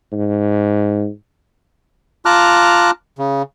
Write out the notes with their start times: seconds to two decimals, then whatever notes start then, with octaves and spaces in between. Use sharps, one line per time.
0.13 G#2
2.25 F4 A5 A#5 D6 F6 F#6
3.18 C#3